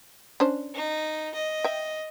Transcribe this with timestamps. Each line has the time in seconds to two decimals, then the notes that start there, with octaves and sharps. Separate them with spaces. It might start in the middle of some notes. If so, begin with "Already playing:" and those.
0.40 C#4 D4 C5
0.75 D#4
1.34 D#5
1.64 E5 G5